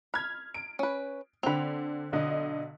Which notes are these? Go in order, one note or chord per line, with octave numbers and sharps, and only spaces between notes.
B5 F6 G#6
D7
C#4 B4
D3 C4 B5 F7
B1 D3 D#5